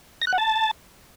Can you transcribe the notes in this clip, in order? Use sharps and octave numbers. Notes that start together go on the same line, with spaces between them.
A#6
F#6
F#5
A5